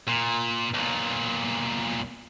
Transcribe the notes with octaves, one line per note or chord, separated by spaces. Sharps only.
A#2
B1 A#2